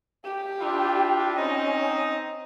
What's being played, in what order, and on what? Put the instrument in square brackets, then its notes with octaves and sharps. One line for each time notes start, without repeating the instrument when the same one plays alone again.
[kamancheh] G4 G5
[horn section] D4 E4 F4
[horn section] C4 D#4 D#5 [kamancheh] C#4